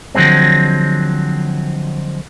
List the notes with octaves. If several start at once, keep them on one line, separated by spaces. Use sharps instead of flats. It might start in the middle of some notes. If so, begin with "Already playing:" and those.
D3 F3 F#3 G#3 C4